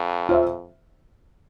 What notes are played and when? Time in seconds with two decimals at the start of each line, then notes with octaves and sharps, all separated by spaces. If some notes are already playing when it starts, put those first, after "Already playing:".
Already playing: F2
0.29 F4 C5 E5